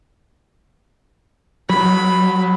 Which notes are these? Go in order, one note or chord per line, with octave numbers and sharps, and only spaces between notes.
F#3 B5